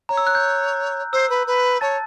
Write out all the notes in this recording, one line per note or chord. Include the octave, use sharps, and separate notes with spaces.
C#5 A#5
E6
F#6
G6
C5 E6
B4
B4
C#5 A5 A6